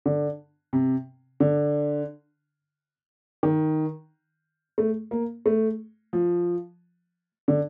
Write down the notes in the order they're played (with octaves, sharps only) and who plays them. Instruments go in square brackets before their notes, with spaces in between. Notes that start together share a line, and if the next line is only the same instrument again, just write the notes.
[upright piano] D3
C3
D3
D#3
A3
A#3
A3
F3
D3